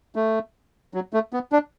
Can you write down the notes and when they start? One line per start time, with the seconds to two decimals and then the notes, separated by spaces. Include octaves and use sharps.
0.16 A3
0.94 F#3
1.13 A3
1.33 B3
1.52 D4